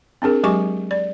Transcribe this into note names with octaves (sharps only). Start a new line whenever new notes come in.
C4 D4 G#4 A#4
F#3 G#3 G4 G#5 C#6 D6
D5